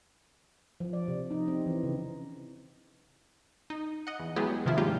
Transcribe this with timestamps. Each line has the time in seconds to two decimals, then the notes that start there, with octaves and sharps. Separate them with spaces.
0.80 F3
0.93 D5
1.08 C3
1.31 D#4
1.48 C4
1.66 E3
1.83 C#3
3.70 D#4
4.07 D#5 F#5
4.20 E2
4.36 F#3 G#3 B3 E4 G4 G#4
4.66 C3 D#3 F3 E4 F4
4.77 G#2 C#3 G3 A#3 F4 G4